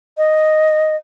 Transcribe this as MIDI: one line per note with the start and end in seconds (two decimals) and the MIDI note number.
0.17 0.96 75